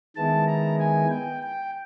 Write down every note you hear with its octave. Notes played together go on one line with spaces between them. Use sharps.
D#3 G#3 B3 E4 A5
A#5
G#5
G5
G5